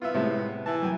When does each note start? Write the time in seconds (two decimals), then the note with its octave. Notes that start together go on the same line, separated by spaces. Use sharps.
0.02 B3 F4 E5
0.14 A2 C3 G#3
0.66 E3 A5
0.82 F#2 G5 G#5